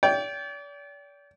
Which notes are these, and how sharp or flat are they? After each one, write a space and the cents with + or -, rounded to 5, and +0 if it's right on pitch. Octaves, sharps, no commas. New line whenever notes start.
D5 -40 G5 +0